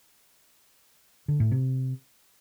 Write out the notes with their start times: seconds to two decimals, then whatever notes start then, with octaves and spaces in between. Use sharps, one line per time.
1.28 D3
1.40 A2
1.51 C3